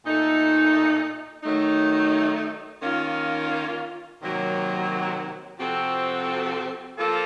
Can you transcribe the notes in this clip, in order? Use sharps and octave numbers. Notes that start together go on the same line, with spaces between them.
A#2 A3 D#4 A4
D#3 F#3 A3 D#4
D#3 A#3 C#4 F4
C3 D#3 F#3 A#3
C3 F3 C4 F#4 A4
F3 A#3 F4 A4